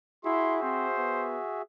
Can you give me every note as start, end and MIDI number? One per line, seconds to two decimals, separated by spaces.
0.25 0.59 64
0.25 1.62 66
0.25 1.62 68
0.25 1.62 76
0.25 0.55 84
0.62 0.87 60
0.62 1.27 72
0.97 1.40 59